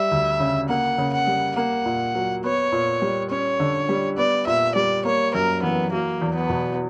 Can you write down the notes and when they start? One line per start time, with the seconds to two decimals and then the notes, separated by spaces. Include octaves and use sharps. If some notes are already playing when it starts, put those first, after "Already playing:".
Already playing: G3 E5
0.11 D2
0.40 C#3
0.69 A#3 F#5
0.98 C#3
1.13 F#5
1.27 G3
1.56 A#3 F#5
1.85 A#2
2.15 F#3
2.44 B3 C#5
2.72 A#2
3.02 G3
3.30 C#4 C#5
3.60 D3
3.89 G3
4.17 B3 D5
4.47 A#2 E5
4.75 G3 D5
5.05 A#3 C#5
5.34 F#2 A#4
5.63 E3 B3
5.92 F#3 A#3
6.21 E2
6.35 B3
6.50 B2